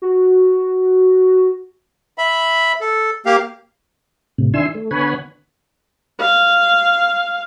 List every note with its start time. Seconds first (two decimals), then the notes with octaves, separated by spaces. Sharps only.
0.02 F#4
2.18 E5 B5
2.81 A4
3.26 A#3 G4 F5
4.38 A2 C3
4.54 D#3 D4 E4 G#5 C6 E6
4.75 A3
4.91 D3 B3 C#5 F#5 G#5 B5
6.20 F5